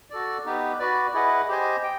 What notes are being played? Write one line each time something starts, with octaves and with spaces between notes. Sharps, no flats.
F#4 A4 D5
B3 D#4 G4 B4
F#4 B4 D5
E4 G#4 B4 D#5 F#5
G4 C5 D#5 G#5
G5